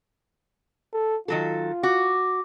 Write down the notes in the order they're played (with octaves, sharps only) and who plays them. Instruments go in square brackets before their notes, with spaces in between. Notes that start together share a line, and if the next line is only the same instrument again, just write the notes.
[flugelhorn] A4
[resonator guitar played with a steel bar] D#3 F#3 A4 [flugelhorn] F4
[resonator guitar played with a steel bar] F#4 [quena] D6